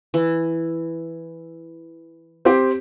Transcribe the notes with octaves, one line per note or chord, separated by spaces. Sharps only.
E3
C4 G4